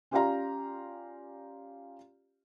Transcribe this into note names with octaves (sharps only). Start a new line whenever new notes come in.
C#4 F4 G4 D5 F5 A#5